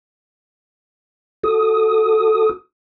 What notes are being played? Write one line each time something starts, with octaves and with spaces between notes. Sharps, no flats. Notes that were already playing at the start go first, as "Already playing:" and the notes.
F#4 A4 D#6